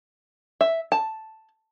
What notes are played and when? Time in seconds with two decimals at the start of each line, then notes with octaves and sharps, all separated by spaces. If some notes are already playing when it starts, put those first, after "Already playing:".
0.61 E5
0.92 A5